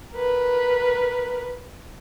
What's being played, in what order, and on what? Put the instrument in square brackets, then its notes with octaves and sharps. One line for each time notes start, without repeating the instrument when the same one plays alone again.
[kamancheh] A#4 B4